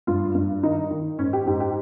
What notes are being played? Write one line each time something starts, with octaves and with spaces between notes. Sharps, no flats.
G2 F4
G2
D#3 D#4
D#3
G#2 C#4
G4
G#2 G4
G4